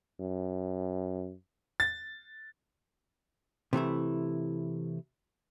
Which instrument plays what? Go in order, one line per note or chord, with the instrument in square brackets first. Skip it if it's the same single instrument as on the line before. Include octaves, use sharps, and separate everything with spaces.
[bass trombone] F#2
[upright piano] A6
[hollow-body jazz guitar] C3 E3 A3 E4